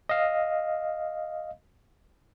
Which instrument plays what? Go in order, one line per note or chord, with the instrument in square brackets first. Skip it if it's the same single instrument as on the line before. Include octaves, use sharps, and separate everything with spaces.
[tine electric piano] D#5 F5